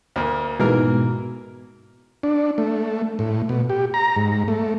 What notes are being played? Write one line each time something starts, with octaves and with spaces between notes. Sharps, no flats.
D2 A#3
G#2 B2 E3 A#3 A#4
D4
A3
A2
B2
G4
A#5
G#2
A3